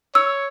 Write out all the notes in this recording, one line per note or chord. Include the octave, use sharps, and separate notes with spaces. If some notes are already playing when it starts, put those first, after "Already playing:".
C#5 E6